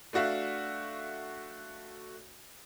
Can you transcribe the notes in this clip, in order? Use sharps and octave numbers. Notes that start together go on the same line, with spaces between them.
A3 D4 F#4 E5 F5